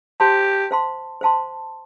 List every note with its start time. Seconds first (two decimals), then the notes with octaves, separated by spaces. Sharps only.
0.20 G4 C5 F5 A5 C6
0.71 C5 F5 A5 C6
1.21 C5 F5 A5 C6